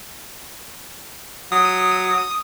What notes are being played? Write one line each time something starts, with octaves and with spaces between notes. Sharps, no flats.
F#3 D#6